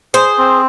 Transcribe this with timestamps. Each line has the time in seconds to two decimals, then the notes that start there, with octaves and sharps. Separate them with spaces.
0.14 G#4 C5
0.38 C4